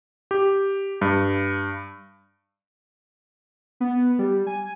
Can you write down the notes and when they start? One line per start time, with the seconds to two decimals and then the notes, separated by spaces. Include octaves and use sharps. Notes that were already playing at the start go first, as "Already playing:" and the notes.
0.31 G4
1.01 G2
3.80 B3
4.19 G3
4.47 G#5